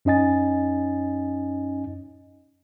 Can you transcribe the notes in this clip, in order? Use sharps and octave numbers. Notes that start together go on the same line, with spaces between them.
F#2 C#4 D#4 D#5 G#5 A6